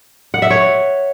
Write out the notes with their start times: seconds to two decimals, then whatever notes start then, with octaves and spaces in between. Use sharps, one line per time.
0.34 F#5
0.42 E5
0.50 C#5